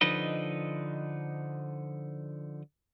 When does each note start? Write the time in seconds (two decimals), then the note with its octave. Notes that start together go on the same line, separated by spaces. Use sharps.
0.01 D3 F3 D#4 B4 D#5